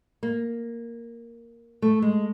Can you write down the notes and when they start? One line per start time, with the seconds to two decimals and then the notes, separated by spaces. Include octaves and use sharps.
0.23 A#3
1.82 A3
2.02 G#3